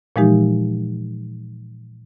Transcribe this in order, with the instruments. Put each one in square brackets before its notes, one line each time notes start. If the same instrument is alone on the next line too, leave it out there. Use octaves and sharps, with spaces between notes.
[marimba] A#2 E3 F3 G#3 D#4 G4